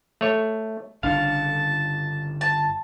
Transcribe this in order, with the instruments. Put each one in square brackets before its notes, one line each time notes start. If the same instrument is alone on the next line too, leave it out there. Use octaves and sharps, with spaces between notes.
[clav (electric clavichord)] A3 C#5
[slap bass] G1 C#3 D4 [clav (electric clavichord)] F5 [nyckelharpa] A5
[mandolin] A5